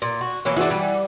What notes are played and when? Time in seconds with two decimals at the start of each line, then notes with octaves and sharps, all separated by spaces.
0.02 A#2
0.21 F#4
0.45 E3 F#3 A#3
0.56 E3 D4 F#4 G#4 E5
0.71 G3